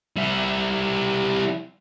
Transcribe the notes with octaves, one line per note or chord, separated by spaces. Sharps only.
G3 E4